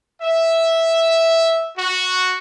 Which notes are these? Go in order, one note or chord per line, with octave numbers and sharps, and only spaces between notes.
E5
F#4